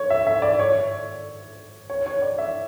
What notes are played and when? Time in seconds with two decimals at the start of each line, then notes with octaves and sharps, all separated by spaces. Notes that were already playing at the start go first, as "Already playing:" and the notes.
Already playing: C#5
0.10 E5
0.27 E5
0.42 D5
0.59 C#5
1.90 C#5
2.06 C#5
2.22 D5
2.38 E5